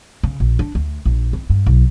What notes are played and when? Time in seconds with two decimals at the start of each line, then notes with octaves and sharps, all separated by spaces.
0.23 C#3
0.40 A#1
0.59 D4
0.75 D2
1.05 A#1
1.33 C4
1.50 G2
1.66 B1